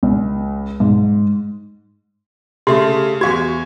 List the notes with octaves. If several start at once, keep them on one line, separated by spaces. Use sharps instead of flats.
C#2
G#2
C#3 A3 G4 C6
E2 F#4 F5 C#6 G#6